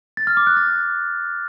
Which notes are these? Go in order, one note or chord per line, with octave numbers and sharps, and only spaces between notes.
A6
F6
D6
F#6
A6